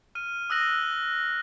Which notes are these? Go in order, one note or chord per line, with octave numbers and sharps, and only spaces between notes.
F6 D#7
D#6 E6 F#6 A#6 F#7